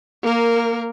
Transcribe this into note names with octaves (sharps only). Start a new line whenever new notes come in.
A#3 A#4